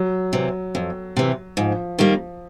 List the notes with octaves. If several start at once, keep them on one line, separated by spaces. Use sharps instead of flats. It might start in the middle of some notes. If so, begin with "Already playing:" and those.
Already playing: F#3
C3 E3
F2
C3 E3
G#2 F3
D#3 G3 A#3